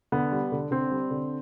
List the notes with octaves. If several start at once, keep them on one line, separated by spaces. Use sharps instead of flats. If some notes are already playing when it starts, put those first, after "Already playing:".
D3 B3
G3
D3
D3 C4
G3
D3